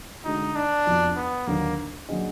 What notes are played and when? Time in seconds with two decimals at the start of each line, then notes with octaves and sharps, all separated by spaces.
0.24 D3 G#3 D4 D#4 F#4
0.55 D4
0.85 F2 F3 B3 D#4 F#4
1.16 B3
1.47 D#2 D3 F#3 A#3 D4
2.09 F#3 A#3 D4 G#4 D#5